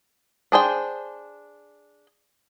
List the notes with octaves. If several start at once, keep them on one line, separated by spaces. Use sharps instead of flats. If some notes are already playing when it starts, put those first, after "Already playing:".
D4 G#4 C5 G5